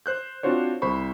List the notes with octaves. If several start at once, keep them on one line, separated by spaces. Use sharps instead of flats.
C5 F#6 G6
C4 D4 F4 F#4 C5 C#5
C2 C5 B5 C#6